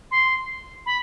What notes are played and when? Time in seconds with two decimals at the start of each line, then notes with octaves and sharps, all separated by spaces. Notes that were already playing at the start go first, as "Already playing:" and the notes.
0.11 C6
0.86 B5